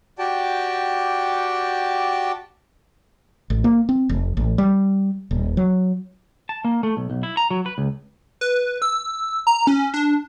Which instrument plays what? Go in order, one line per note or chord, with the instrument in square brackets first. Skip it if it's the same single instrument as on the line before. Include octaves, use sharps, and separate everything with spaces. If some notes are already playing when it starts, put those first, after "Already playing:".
[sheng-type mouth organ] F#4 G4 D5 G5 A5
[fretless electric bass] A1
A#3
C4
F1
A1
G3
D#1
F#3
[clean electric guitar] A5
A#3
A3
B1
B1
E4
A#5
F#3
B4
C#2
[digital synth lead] B4
E6
A#5
C#4
D4